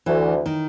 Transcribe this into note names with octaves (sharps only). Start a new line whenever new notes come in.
D2 E3
D#3